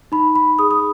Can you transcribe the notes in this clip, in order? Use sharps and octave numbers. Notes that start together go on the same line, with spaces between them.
D#4 B5
B5
G#4 D#6
D#6